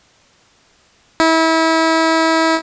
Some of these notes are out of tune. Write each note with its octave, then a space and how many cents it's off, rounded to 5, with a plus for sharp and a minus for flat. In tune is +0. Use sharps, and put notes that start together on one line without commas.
E4 -30